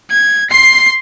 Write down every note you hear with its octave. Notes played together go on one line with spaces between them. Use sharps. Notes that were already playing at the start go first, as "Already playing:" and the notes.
G#6
C6 C7